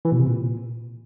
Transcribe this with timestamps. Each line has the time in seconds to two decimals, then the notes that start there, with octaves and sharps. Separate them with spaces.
0.05 E3
0.12 B2
0.19 C3
0.27 A#2